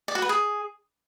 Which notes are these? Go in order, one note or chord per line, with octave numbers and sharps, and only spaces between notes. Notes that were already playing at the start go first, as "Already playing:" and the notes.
D5
F#4
B4
G#4